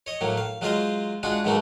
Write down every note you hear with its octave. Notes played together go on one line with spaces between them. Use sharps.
C#5 D#5
A2 F#3 A#3
F5
F#3 G#3 F4 C5 D#5 F5
G#3 D4 F4 F#4 G#4
G#2 B2 F#3 A3 A#3 F#4